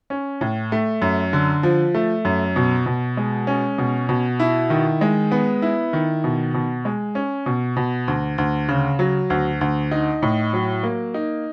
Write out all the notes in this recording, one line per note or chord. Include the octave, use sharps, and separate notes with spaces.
C#4
A2
A3
F#2
D3
F3
A3
F#2
B2
B2
G#3
C#4
B2
B2
E4
D#3
G#3
B3
E4
D#3
B2
B2
G#3
C#4
B2
B2
D2
D2
C#3
F#3
D2
D2
D#4
A2
F#3
A#3
D#4